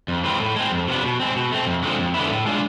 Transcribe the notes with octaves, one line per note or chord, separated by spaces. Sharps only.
F2
E3 G#3 C4 F4
A2
G#3 C4
F2
C3 F3 B3 D4
B2
G#3 C4
B2
A3 C4
F2
D3 G#3 C4 F4
F2
D3 G#3 B3 E4
A2
G#3 D4 F4